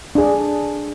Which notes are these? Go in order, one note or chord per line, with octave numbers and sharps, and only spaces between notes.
D4 G#4